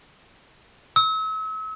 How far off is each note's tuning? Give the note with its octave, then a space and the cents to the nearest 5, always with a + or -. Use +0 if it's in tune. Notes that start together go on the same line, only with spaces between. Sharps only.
E6 -40